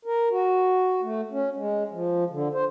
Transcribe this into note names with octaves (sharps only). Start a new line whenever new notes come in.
A#4
F#4
A3
C#4
G#3
F3
D3
C5